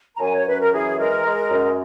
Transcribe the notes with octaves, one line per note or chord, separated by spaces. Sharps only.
A#5
F#2 G#5
C#5
F#2 B4
A#4
E3 G#4
G#3 A#4
G#3
F#2